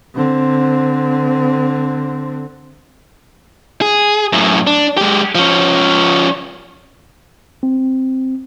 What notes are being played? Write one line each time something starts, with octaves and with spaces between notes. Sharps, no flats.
D3 C4
G#4
F#2 A2
D4
G#3 G4
F3 C#4
C4